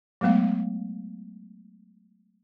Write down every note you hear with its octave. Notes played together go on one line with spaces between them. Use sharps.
F#3 G#3 A3 B3 F5